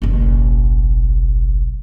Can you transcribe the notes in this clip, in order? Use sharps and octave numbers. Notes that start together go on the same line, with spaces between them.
F#1 B1